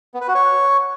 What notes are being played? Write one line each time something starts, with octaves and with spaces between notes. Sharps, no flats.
B3
B4
F#4
C#5